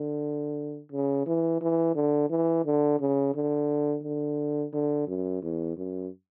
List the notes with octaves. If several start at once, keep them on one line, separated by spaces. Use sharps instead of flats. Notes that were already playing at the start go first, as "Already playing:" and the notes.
Already playing: D3
C#3
E3
E3
D3
E3
D3
C#3
D3
D3
D3
F#2
E2
F#2